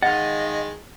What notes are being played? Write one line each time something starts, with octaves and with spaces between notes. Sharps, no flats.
D#3 G#3 D#5 F5 F#5 A6